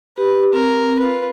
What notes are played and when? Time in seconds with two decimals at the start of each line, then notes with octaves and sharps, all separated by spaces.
0.18 G4 B4
0.53 C4 A#4
0.99 F4 B4